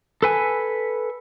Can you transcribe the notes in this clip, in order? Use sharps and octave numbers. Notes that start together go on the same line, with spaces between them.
A4 B4 G#5